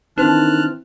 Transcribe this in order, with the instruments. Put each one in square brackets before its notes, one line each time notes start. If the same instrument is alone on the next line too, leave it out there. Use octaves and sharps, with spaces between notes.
[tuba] D#3 [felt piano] E3 C4 [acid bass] D4 [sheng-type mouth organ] A5 F6 F#6